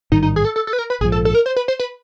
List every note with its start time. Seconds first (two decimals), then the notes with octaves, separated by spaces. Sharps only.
0.12 A1 G#2 D#3 G3 D#4
0.23 D#4
0.36 G#4
0.45 A4
0.56 A4
0.67 A4
0.73 B4
0.79 A#4
0.90 B4
1.01 A#1 G#2 F3 G#4
1.12 A4
1.25 A4
1.35 A#4
1.46 C5
1.56 B4
1.68 C5
1.80 B4